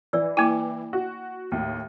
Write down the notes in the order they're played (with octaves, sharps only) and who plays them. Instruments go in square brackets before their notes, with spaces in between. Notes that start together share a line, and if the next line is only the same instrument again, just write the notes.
[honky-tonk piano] E3 [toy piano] D5 E6
[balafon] A#3 E4 [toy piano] G5 G#5 D6
[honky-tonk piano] F#4
D#2 A2